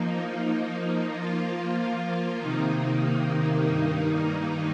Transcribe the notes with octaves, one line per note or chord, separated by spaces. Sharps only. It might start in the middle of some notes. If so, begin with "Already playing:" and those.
Already playing: F3 A#3 D#4
F3 A#3 F4
C3 D#3 A#3 D#4
G2 D#3 A#3 D#4